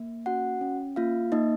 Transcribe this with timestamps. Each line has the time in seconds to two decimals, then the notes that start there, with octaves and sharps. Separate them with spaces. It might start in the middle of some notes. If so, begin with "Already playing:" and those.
Already playing: A#3
0.26 C#4 F#4 F#5
0.61 C#4
0.96 A#3 F4 F5
1.32 A#3 D#4 D#5